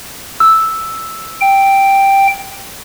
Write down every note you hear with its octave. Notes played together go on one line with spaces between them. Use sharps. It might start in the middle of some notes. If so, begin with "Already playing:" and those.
E6
G5